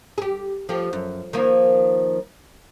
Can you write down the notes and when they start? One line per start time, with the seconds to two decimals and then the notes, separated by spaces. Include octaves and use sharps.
0.18 G4 G#4
0.69 F3 A3 G4
0.93 F#2
1.33 D#3 F3 A#3